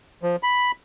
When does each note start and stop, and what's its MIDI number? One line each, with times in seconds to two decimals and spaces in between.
0.23 0.36 53
0.43 0.71 83